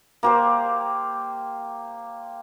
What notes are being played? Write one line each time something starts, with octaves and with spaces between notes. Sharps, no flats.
A#3 G4 C5